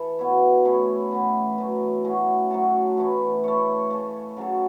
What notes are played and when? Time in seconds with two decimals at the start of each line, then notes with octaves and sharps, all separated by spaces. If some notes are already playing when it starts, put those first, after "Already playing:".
Already playing: E3 A4
0.19 B2 B3 E4 C#5
0.65 A2 A3 C#4 E4
1.11 A2 E3 B3
1.58 F#2 E3 A3
2.04 A2 A3 C#4 F#4
2.50 F#3 A3 F#4 A4
2.97 A2 E3 A3 E4
3.44 A3 E4 C#5
3.90 C#3 A3 C#4 A4
4.37 C#3 F#3 C#4 A4